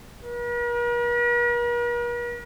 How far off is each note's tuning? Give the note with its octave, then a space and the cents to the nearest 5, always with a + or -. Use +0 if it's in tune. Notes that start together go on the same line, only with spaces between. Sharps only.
A#4 +45